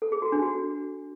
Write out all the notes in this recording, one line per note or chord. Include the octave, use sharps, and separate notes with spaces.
A4
G#4
F#4
D4
F#4